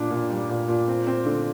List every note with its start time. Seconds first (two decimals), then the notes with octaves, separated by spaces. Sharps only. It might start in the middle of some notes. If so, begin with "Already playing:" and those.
Already playing: A#2 D4
0.11 A#2
0.30 G3
0.49 A#2
0.68 A#2
0.88 C4
1.07 C4
1.26 D3